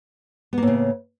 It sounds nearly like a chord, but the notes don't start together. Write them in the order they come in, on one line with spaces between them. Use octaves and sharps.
B3 A#3 A2 C#3